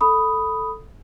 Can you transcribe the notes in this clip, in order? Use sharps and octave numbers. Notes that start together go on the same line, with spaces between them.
A4 B5 D#6